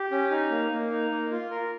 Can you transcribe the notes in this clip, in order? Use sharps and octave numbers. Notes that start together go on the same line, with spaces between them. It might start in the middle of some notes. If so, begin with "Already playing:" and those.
Already playing: G4
C#4
D#4
A#3
A#3
D#4
A#3
F4
A#4